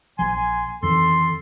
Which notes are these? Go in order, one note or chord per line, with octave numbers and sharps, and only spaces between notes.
A#1 F3 G#5 C6
F2 D#3 E3 A4 C6